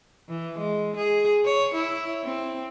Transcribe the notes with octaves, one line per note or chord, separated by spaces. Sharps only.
E3
G#3
G#4
C#5
E4
C4